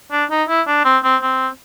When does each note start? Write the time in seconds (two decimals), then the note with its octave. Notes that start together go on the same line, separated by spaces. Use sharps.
0.12 D4
0.31 D#4
0.49 E4
0.67 D4
0.85 C4
1.04 C4
1.22 C4